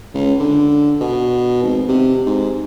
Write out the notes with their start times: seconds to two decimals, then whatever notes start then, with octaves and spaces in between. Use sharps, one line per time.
0.14 C#2
0.40 D3
1.00 B2
1.63 G#1
1.88 C3
2.26 G#2